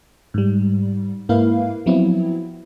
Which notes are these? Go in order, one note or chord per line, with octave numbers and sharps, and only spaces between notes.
G#2 G3
G#2 A#3 E4 B4 F5
F3 F#3 B3 C4 E4